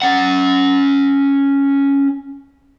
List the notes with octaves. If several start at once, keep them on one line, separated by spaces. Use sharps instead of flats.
C#4 F#5